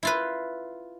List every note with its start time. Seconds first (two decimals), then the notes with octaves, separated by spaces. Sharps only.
0.03 E4 F4 B4